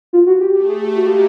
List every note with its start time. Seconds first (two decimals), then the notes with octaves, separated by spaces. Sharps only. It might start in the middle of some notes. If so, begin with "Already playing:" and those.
0.13 F4
0.26 F#4
0.40 G4
0.54 A3 G4
0.69 G#4
0.83 G4
0.96 G#3 A#3 F#4
1.06 G4